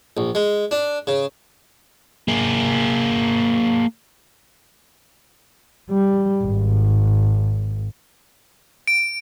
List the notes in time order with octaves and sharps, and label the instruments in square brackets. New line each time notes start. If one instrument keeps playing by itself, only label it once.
[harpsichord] A#1
G#3
D4
C#3
[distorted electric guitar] A#3 G#4
[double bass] G3
G#1
[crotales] D7